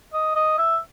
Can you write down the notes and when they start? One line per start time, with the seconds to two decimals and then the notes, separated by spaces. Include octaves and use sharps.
0.13 D#5
0.35 D#5
0.58 E5